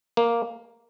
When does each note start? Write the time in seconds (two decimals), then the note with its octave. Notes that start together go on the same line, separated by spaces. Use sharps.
0.17 A#3